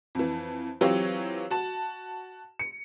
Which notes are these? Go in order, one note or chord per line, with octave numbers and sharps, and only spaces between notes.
F2 E3
E3 F#3 C4 F4 G4 C#5
F#4 A5
C#7